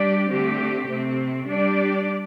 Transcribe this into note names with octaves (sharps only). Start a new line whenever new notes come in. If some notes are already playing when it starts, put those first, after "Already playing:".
Already playing: G3 D4 G4 D5
D3 A3 C4 G4
C3 A3 C4
G3 D4 G4 D5